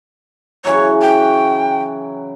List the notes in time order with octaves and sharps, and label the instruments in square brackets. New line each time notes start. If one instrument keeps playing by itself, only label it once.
[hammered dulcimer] C#3 E3 F#3 [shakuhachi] C#5
[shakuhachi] G5